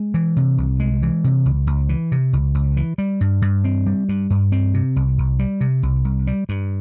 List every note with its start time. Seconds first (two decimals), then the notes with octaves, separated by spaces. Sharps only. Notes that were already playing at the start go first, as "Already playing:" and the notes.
Already playing: G#3
0.14 E3
0.36 C3
0.58 C2
0.80 G#3
1.02 E3
1.24 C3
1.46 C#2
1.67 C#2
1.89 E3
2.12 C3
2.33 C#2
2.54 C#2
2.77 E3
2.98 G3
3.21 G2
3.42 G2
3.64 C4
3.86 G3
4.09 G2
4.30 G2
4.52 C4
4.74 C3
4.96 C2
5.18 C2
5.39 G3
5.61 C3
5.83 C2
6.05 C2
6.27 G3
6.49 G2